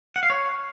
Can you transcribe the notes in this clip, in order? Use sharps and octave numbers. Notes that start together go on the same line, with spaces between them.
F#5
F5
C#5